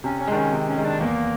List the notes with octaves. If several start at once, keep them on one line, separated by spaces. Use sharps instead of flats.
C3 C#4
C#4
D#3 G#3 D4
C#4
C3
C#4
D#3 G#3
D4
E2 A#3